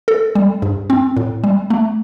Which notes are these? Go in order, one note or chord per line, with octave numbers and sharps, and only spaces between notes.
A4
G3
G2
C4
A2
G3
A3